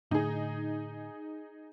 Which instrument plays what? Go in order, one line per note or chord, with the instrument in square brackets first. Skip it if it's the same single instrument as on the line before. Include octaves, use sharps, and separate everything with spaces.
[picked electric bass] A2 D3 [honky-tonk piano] D#4 G#4